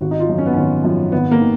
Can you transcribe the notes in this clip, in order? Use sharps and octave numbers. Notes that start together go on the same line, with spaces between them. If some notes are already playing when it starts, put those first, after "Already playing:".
G#1 F#4
D#4
F4
F#2 F3
C#4
B3
G#1 C#4
F#2 F3
G#1 B3
A#3
D#3